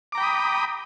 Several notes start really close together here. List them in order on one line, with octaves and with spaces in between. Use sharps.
D6 A#5 G5 B5 D#6